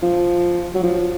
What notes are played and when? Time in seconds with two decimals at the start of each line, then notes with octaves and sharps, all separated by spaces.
0.03 F3
0.75 F#3
0.83 F3